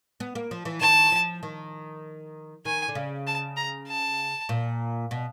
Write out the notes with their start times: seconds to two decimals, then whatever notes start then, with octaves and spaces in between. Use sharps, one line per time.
0.20 B3
0.35 A#3
0.51 F3
0.65 E3
0.81 D#3 A5
1.12 F3
1.43 D#3
2.65 D#3 G#5
2.88 D3
2.95 C#3
3.27 A5
3.57 A#5
3.87 A5
4.49 A#2
5.11 B2